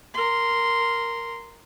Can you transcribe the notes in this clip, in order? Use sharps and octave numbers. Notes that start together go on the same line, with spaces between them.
A#4 C6